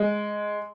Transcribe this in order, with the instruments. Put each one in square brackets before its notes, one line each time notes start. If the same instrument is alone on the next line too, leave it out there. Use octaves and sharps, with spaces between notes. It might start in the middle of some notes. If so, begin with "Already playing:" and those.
Already playing: [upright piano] G#3